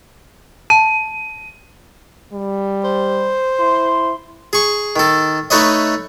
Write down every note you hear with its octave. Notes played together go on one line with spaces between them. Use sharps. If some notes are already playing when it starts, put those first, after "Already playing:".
A5 D#7
G3
C5
E4 C6
G#4 C#6
D#3 A4
A3 D#4 A4 B4 C#5 D#5